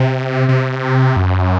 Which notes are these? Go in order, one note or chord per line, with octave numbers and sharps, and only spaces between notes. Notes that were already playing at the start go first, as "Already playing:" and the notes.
Already playing: C3
C3
F#2